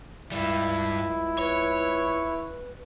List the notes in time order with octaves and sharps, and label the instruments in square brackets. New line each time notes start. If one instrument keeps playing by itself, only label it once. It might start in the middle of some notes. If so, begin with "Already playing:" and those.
[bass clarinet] C#2 [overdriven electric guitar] G2 G3 [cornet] E4
[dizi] B4 [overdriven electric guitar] C#5